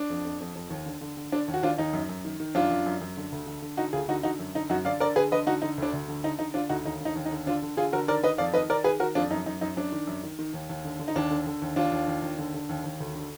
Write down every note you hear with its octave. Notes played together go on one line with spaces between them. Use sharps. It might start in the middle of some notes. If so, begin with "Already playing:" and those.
Already playing: D4
F2
F2
F2
F2
D#2
D3
D3
D3
D3 D4
D#2
F#4
D#2 D4 F4
D#2 D#4
F#2
F#2
D#3
D#3
F#2 D4 F4
F#2
F#2
F#2
D3
D2
D3
D3
D3 D#4 F#4
D2 F4 G#4
D3 D#4 F#4
D3 D#4 F#4
F#2
D3 D#4
F#2 D#4 F#4
D3 D5 F5
D3 A#4 D5
D3 G#4 B4
D3 B4 D#5
D3 D#4 F#4
D3 D#4
D2 D4
D2
D3
D3 D#4
D3 D#4
D3 D4 F4
D2 D#4 F#4
D#2 D#4
D3 D#4
D#2
D#4
D3
D3 D4 F4
D3
D3 F4 G#4
D3 F#4 A#4
D#3 A#4 D5
D#3 B4 D#5
F2 D5 F5
D#3 B4 D#5
D#3 A#4 D5
D#3 G#4 B4
D#3 F#4 A#4
F2 D4 F4
F#2 D#4
F#2 D#4
F#2 D#4
F#2 D4
D#3
F#2
D#3
D#3
D#2
D#2
D3
D3
D#4
D#2 D4
D3
D3
D#2
D#2 D4 F4
D#2
D#2
D#2
D3
D3
D#2
D#2
D2
D3